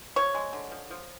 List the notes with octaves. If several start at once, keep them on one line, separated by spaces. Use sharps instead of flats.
F3 C#5
G#3
D3
F3
F3